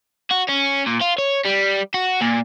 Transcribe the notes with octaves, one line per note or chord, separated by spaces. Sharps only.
F#4
C#4
A#2
F4
C#5
G3
F#4
A#2